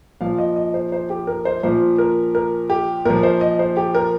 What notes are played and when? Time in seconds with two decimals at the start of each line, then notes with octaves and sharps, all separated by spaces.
0.21 A#2 F3 F5
0.38 D#5
0.56 D#5
0.74 C5
0.92 C5
1.10 G4
1.27 A#4
1.45 C5
1.63 A#2 F3 C5
1.98 A#4
2.35 A#4
2.70 G4
3.05 A#2 F3 A#4
3.23 C5
3.41 D#5
3.59 C5
3.77 G4
3.95 A#4